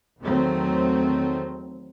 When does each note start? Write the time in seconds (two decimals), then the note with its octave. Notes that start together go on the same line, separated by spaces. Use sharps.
0.21 E2 D#3 F#3 A3 C4